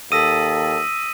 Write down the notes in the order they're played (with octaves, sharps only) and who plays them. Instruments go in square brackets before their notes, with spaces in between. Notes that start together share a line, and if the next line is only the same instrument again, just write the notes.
[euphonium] D#2 [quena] A4 [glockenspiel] D#6 A#6 B6 [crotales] E6 D#7